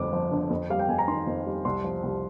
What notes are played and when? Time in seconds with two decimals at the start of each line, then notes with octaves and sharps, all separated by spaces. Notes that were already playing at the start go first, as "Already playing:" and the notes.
Already playing: G1 F2 D3 F3 D6
0.13 F3
0.31 D3
0.50 F2
0.70 G3 F5
0.79 G5
0.89 F2 G#5
0.99 A#5
1.08 D#3 C6
1.27 F2
1.46 G3
1.65 C2 C6
1.84 F3
2.03 C2